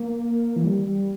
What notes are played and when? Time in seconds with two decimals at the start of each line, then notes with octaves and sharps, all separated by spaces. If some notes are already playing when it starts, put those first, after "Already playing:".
Already playing: A#3
0.56 E3
0.64 G3